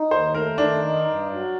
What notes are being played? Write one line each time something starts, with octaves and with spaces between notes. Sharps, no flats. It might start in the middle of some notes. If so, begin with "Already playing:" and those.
Already playing: D#4
D#2 C5
A3 A#4
D#3 D4
D#4
G2
F#3